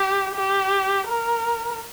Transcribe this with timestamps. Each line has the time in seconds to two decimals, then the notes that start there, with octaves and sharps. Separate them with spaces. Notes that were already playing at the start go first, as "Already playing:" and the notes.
Already playing: G4
0.35 G4
1.07 A#4